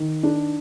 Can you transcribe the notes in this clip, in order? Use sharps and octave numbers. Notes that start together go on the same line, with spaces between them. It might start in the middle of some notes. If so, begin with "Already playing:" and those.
Already playing: D#3
D4